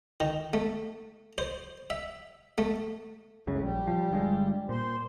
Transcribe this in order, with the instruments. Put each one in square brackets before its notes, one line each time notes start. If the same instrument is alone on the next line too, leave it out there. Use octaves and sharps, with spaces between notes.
[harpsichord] D#3
A3
C5
E5
A3
[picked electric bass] C#2 F#2 C#3 [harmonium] A2
[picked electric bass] A#1 [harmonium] G3
[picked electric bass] F3
G1 G2 G#3
[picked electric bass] A#2 [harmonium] C5